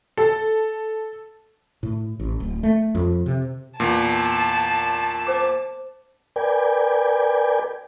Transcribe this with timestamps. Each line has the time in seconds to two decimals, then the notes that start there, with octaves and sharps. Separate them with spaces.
0.17 A4
1.83 A2
2.19 A1
2.40 D1
2.63 A3
2.95 F2
3.26 C3
3.80 E2 A#2 A5
5.27 C5 D6
6.36 A#4 B4 D5 G5 G#5